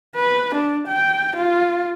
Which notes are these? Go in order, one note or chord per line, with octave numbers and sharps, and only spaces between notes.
B4
D4
G5
F4